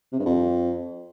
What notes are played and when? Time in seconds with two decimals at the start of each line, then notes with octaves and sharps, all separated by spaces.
0.12 C3
0.19 G2
0.26 F2